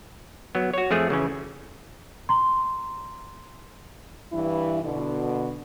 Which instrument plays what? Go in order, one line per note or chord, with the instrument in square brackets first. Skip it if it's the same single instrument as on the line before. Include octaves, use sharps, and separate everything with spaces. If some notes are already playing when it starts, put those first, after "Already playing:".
[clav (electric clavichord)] F#3 B3
F#4 C#5
F2 F3 A3 G#4
C#3 E3 C#4
[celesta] A#5 C6
[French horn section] G2 E3 E4
B2 D3